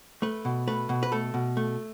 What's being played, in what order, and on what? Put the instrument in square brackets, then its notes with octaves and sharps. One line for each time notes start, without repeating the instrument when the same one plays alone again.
[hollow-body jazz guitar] A3 B4
B2
A3 B4
B2
B4
A3 A4
B2
A3